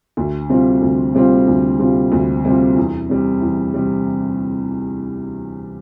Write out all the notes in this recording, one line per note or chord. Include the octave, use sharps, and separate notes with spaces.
D2
C3 G3 C4 F4
D2
C3 G3 C4 F4
D2
C3 G3 C4 F4
D2
C3 G3 C4 F4
E2
C3 G3
E2
C3 G3